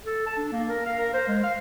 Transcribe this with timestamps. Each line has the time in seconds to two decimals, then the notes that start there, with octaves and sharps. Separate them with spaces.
0.05 A4
0.26 A5
0.37 D4
0.52 A#3
0.69 A#4
0.86 F5
0.99 A#4
1.14 C5
1.27 G#3
1.44 F5